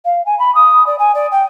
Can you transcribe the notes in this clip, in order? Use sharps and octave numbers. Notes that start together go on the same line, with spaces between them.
F5
G#5
B5
D#6
D5
G#5
D5
G5